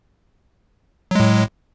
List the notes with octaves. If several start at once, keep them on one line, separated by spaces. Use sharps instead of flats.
A2 F#3 G#3